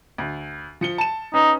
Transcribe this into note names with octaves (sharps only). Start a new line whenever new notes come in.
D2
F3 C#7 G7
A5 E7
C#4 D#4 B4